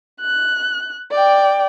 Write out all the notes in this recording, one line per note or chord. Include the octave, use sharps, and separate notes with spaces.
F#6
D5 G5